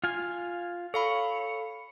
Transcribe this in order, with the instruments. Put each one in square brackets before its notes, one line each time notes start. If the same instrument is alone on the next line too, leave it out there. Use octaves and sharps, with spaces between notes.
[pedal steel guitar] F4 F5 G#5
[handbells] A4 F5 B5 [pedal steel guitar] C#5